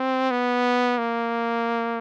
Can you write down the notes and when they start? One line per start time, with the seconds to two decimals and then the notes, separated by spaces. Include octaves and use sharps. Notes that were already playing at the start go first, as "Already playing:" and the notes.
Already playing: C4
0.31 B3
0.98 A#3